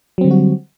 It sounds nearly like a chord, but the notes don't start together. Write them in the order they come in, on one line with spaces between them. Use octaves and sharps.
F#3 C4 D3 G3 F#4